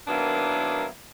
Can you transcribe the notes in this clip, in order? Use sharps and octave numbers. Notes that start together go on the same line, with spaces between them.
D#3 F#3 A#3 B3 D4 E4